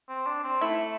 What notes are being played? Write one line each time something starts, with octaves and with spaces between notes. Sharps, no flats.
C4
D4
C4
A3 E4